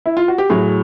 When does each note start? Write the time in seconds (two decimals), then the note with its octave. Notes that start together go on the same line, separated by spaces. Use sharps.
0.06 E4
0.17 F4
0.28 F#4
0.38 G4
0.50 A2 F#3 G#4